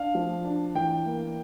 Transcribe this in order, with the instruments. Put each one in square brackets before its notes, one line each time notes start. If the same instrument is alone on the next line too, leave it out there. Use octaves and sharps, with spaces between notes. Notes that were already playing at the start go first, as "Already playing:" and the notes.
Already playing: [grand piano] D4 F5
F3
D4
E3 G5
A#3